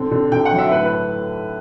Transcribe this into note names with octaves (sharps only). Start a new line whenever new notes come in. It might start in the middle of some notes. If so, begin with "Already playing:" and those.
Already playing: D3 C4
D3
D3 G5
F#5
F#3
E5
A2 B4
B4